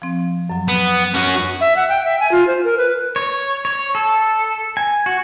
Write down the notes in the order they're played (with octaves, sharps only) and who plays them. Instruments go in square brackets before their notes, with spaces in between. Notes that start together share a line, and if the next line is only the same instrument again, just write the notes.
[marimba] F3 C4
F#2 F#3
[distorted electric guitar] B3
C#4 F#4
[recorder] E5
F#5
G5
E5
G#5
F4
C5
A#4
B4
[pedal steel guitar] C#5
C#5
A4
G#5
F#4